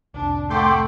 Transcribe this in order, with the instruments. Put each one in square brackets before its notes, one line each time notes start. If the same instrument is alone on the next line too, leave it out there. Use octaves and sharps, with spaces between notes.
[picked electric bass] F1 C2 [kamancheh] D4
[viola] A3 [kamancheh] A4 F#5 [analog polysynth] G5 C6 D6